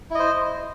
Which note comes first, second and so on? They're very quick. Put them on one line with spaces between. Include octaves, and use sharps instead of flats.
E4 D#5 C5